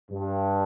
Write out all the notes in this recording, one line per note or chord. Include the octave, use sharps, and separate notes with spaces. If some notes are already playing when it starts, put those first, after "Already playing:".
G2